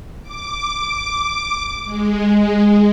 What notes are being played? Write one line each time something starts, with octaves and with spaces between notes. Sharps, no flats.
D6
G#3